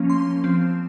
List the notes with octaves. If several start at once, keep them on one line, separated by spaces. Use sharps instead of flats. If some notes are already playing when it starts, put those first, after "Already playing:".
Already playing: F3 A#3 C#4
C6
F3 C4